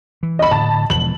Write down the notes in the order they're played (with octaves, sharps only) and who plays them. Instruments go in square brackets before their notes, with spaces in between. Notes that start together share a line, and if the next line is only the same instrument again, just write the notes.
[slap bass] E3
[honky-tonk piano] D#5 B5
[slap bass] A2 D3 [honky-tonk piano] A5
[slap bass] E1 E3 F3 [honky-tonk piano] F#7